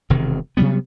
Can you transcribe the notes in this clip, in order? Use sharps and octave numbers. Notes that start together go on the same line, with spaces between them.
E1 C3 D#3
C3 F#3 G3 B3